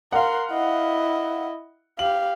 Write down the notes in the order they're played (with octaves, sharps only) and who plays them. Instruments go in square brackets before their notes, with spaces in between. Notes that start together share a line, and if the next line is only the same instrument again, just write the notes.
[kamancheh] A#4 C6 [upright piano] F5 F#5
[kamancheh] E4 D#5
[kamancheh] G4 F5 [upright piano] F#7